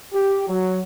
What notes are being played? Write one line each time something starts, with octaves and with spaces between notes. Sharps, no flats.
G4
F#3